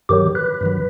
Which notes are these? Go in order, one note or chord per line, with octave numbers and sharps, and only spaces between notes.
G2 D#3 F#3 G4
B4
G2 D#3 F#3